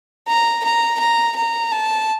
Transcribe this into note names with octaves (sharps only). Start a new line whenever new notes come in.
A#5
A#5
A#5
A#5
A5